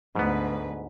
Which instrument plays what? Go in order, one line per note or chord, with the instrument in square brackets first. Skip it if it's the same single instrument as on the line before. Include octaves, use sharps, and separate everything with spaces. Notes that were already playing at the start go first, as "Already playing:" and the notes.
[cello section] D2 B4 [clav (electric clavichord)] G#2 B3